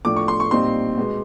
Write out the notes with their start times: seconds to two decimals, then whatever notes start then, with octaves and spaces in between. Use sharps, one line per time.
0.05 A2 F3 A3 D4 D6
0.16 C#6
0.28 C6
0.40 C#6
0.51 A#2 G3 C4 D#4 C6
0.97 B2 G#3 B3